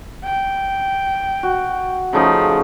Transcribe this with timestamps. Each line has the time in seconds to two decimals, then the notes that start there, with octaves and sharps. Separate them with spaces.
0.24 G5
1.43 F#4
2.13 C#3 F3 A3 D#4